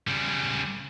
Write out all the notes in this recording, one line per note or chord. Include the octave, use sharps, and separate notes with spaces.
C#3 G3